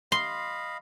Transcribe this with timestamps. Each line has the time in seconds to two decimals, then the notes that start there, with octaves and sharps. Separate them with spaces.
0.12 D#5 F5 B5 C6